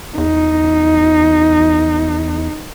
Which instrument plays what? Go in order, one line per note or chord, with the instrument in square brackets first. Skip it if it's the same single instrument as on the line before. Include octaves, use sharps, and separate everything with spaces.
[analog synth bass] E2 [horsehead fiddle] D#4